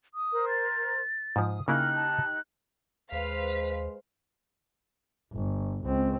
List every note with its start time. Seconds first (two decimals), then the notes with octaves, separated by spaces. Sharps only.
0.14 D#6
0.32 A#4 C5
0.49 A6
1.36 G#2 F3 D#6
1.68 C#3 A#3 D#4 E4 G4 F6 F#6
1.95 A5
3.12 D#2 G#3 B4 C5 F5 B6
5.33 G1
5.85 C#2 C4